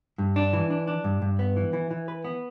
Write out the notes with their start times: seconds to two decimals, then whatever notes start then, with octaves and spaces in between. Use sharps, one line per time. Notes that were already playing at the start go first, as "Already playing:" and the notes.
0.18 G2
0.36 D4
0.53 E3
0.70 D4
0.87 D4
1.04 G2
1.22 G2
1.39 B3
1.56 E3
1.73 E3
1.91 E3
2.08 B4
2.24 B3